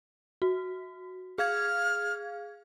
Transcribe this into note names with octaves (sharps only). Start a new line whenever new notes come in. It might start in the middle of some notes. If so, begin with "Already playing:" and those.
F#4
G#4 F5 F6 G#6